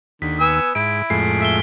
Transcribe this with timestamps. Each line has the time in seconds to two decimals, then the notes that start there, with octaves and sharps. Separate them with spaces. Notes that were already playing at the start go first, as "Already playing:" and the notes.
0.22 D#2 D3 B6
0.40 B3 G#5 E6
0.75 G#2 E4 D7
1.10 F2 A2 G#3 C7
1.41 E5 B6 G7